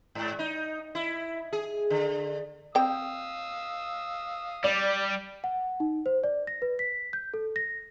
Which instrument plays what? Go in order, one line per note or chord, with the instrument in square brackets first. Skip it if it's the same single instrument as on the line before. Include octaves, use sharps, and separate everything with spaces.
[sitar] G#2
D#4
E4
G#4
D3
[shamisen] C4 G5 [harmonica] F5 D#6 E6
[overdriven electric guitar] G3 [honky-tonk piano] D5
[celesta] F#5
D#4
C5
D5
A#6
B4
B6
G6
A4
A#6